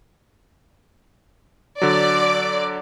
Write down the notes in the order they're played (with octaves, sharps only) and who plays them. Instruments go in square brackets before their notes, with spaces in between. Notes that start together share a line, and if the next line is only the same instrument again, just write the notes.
[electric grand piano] D3 F#3 [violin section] D5